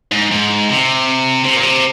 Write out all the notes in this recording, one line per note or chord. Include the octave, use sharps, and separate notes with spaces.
G#2
G#2
C3
C3
A#2
C3